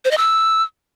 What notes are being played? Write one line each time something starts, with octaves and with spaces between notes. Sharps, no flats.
C5
D#5
E6